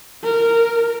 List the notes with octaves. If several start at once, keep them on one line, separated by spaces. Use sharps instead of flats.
A#4